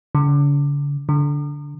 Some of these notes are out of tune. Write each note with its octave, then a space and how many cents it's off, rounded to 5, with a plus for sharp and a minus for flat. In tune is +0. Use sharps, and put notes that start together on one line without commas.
D3 -45
D3 -15